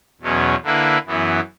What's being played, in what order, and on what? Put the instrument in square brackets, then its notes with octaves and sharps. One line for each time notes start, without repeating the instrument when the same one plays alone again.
[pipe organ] E2 B2 F#3 C#4
D3 A#3 E4 B4
F#2 E3 B3